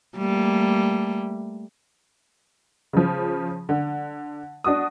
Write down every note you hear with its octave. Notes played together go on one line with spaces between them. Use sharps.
G3 A3 A#3
C#3 F3
D3
D4 F#4 D#6